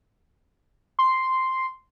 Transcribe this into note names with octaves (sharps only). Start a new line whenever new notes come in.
C6